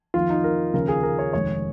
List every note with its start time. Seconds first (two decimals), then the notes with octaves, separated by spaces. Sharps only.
0.14 F2 D#3 A#3 F4
0.30 D#4
0.44 A#4
0.74 D#2 C#3 F3 A#4
0.88 G#4
1.03 A#4
1.19 C#5
1.33 F1 D#2 D#3 G#3 C#5